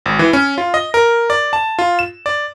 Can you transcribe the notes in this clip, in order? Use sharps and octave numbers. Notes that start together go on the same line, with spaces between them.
G#1
E3
C#4
F4
D#5
A#4
D5
A5
F4
E7
D5